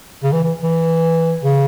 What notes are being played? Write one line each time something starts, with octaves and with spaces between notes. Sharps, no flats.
C#3
E3
E3
E3
C#3